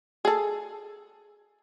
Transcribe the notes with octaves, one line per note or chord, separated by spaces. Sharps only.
G#4 A4